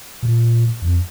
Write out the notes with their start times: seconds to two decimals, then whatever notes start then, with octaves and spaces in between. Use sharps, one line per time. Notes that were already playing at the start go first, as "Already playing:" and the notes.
0.23 A#2
0.82 F2